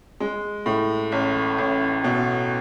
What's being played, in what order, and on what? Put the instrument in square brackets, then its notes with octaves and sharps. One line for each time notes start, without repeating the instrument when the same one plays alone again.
[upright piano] G#3
A2
A1
A1
B2